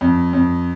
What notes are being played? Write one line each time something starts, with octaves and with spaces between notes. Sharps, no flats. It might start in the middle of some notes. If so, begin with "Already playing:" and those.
F2
F2